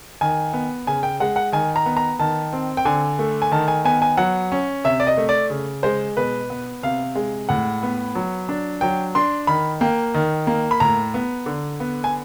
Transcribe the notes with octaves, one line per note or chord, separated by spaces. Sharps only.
D#3 G#5
B3
C#3 G#5
G5
G#3 F#5
F#5
D#3 G#5
A#5
B3
A#5
D#3 A5
C4
G5
D3 G#5
A3
G#5
D#3 A5
G#5
B3 G#5
G#5
F#3 F#5
C#4
C3 E5
D5
D#5
A3
D5
C#3
G#3 C5
B2 B4
B3
C3 F5
G#3
A2 F#5
B3
F#3
D4
F#3 G5
D4 C6
D#3 B5
A#3 G5
D#3
A#3
B5
A2 A#5
B3
D3
B3
G#5